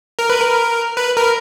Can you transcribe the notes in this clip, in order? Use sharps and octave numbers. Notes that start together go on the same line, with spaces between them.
A#4
B4
A#4
B4
A#4